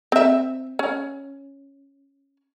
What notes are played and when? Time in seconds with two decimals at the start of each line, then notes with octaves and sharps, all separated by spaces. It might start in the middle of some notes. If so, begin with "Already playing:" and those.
0.12 C4 E5
0.79 C#4